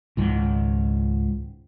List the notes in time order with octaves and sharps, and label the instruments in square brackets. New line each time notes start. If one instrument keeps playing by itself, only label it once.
[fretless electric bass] C#2 G#2 D#3